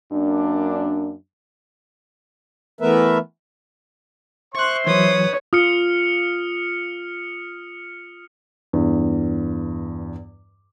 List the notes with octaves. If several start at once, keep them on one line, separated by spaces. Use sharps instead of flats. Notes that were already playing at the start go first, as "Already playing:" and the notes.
F#2 A#3 D4
E3 A3 B3 A#4 B4 E5
C5 E5 C6 C#6 F#6
E3 F#3 B4 C#5 D#6
F4 D#6 F6 C#7
E2 G2